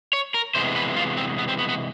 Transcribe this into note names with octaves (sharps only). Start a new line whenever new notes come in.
C#5
A#4
C3 E3 G#3 B3 C5
B4
F4
C4
B3
C4
B3
B3